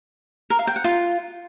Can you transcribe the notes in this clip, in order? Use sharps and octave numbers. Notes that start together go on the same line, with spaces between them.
A#4
F5
G5
F#5
F4